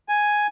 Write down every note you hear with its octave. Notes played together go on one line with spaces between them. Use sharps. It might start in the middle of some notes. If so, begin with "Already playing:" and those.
G#5